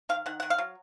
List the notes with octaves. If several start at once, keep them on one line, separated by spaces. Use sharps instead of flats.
D#3 F5
D#3 F#5
D#3 F#5
F5
F#3